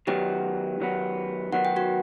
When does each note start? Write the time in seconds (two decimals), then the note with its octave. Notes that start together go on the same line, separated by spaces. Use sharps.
0.07 D#3 F#3 B3 G4 G5
0.80 D#3 F#3 B3
1.52 D#3 F#3 B3 F#5
1.65 G5
1.76 F#4 F#5